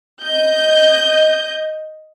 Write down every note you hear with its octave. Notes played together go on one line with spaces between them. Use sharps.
D#5 G6